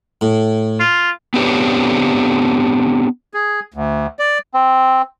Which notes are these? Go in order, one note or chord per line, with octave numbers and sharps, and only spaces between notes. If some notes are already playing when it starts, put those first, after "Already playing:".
A2
F4
B3 C4 D4 G4 B4 C#5
G#4
D2
D5
C4